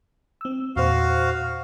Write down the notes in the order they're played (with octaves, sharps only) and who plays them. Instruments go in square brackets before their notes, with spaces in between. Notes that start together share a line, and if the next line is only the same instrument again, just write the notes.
[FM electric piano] C4 E6
[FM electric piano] E2 A#2 C5 [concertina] F#4 F5